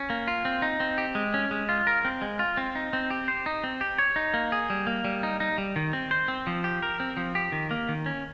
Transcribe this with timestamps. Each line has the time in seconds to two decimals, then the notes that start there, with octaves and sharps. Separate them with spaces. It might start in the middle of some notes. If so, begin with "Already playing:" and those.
Already playing: C#4
0.10 A#3
0.28 F4
0.45 C4
0.62 D#4
0.80 C4
0.98 G4
1.15 G#3
1.34 C#4
1.51 G#3
1.69 F4
1.87 A#4
2.05 C4
2.22 G#3
2.39 F4
2.57 C4
2.75 D#4
2.93 C4
3.11 G4
3.28 C5
3.46 D#4
3.64 C4
3.81 G4
3.99 C#5
4.16 D#4
4.34 A#3
4.52 G#4
4.70 G3
4.87 A#3
5.05 G3
5.23 D#4
5.40 D#4
5.58 G3
5.76 D#3
5.93 C4
6.11 C5
6.28 C4
6.47 F3
6.64 G4
6.82 A#4
7.00 C4
7.17 F3
7.35 G4
7.52 D#3
7.71 A#3
7.89 D#3
8.06 C#4